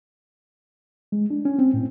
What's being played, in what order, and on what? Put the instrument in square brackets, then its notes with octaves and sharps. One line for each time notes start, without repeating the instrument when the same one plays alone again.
[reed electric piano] G#3
D4
C#4
C4
A2